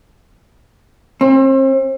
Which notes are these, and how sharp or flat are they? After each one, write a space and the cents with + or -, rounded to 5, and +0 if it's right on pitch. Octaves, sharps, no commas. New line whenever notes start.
C4 +40